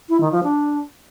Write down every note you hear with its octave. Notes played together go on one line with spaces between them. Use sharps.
E4
D#3
F3
D4